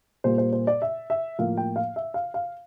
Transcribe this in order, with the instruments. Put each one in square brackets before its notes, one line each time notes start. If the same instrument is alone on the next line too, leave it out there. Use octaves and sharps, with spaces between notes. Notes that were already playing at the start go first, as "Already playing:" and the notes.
[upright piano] A#2 G3 A#3 C5
C5
C5
D5
E5
E5
A2 F3 A#3 F5
G5
F5
E5
F5
F5